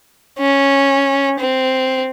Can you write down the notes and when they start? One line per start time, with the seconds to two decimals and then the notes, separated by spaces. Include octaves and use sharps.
0.39 C#4
1.40 C4